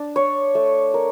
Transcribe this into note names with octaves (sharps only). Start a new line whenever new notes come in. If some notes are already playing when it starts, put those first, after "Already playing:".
Already playing: D4
C#5
A3
A#4